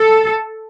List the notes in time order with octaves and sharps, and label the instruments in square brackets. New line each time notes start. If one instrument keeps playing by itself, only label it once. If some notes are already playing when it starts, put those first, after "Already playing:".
Already playing: [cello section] A4